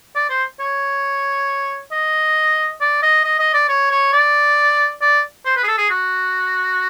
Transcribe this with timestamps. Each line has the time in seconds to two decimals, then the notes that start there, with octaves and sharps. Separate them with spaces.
0.16 D5
0.30 C5
0.60 C#5
1.92 D#5
2.81 D5
3.03 D#5
3.24 D#5
3.39 D#5
3.54 D5
3.69 C#5
3.91 C#5
4.13 D5
5.01 D5
5.46 C5
5.57 B4
5.64 G#4
5.68 A4
5.78 G#4
5.90 F#4